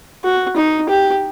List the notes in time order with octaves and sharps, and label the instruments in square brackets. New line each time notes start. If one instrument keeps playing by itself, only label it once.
[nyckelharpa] F#4
D#4
G4